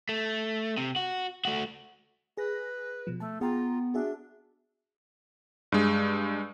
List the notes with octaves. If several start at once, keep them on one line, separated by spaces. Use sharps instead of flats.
A3
C3
F#4
A3 F#4
G#4 B4 A#6
B2 F3
A3 A5
B3 F4 G#4 G5 A#5
D4 F#4 G#4 E5
G2 G#3